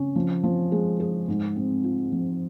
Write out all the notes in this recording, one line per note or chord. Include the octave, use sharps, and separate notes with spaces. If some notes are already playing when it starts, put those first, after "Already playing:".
Already playing: C#3 C#4
F3
F3
G#3
G#4
G#2
C4
F4
F3